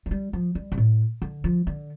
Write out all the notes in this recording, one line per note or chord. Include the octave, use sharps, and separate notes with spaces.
F3
G3
F3
G3
C3
A2
D3
F3
D3